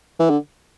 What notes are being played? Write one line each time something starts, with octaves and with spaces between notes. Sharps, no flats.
E3
D3